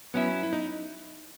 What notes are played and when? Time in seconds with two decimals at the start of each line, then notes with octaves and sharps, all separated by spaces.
0.14 F#3 B3 C#4 E4
0.43 E4
0.53 D#4